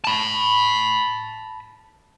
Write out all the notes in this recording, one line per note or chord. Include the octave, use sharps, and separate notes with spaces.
A5 B5